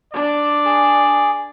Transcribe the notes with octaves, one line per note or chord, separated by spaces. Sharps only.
D4 D5
G#4